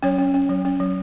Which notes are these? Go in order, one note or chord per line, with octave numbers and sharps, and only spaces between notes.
F#3 C#4 C#5
C#4
C#4
F#3
C#4
F#3